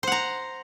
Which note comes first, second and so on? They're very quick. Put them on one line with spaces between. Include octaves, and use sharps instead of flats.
C5 F#5 A#5